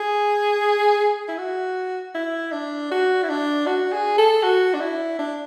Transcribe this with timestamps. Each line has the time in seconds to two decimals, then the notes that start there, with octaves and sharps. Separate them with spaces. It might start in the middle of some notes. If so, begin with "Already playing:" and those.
Already playing: G#4
1.28 E4
1.38 F#4
2.15 E4
2.52 D4
2.91 F#4
3.23 E4
3.29 D4
3.66 F#4
3.93 G#4
4.18 A4
4.43 F#4
4.74 D4
4.81 E4
5.19 D4